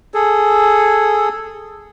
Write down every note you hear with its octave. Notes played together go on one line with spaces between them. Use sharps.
G#4 A4